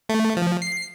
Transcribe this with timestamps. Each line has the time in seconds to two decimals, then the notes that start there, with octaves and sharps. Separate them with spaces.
0.09 A3
0.37 F3
0.62 C7